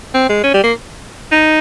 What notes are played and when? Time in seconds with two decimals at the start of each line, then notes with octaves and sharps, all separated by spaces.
0.14 C4
0.29 G#3
0.43 C#4
0.54 G3
0.64 A#3
1.32 D#4